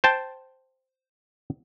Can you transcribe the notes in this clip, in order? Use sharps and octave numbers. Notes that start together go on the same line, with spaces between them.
C5 G5 A5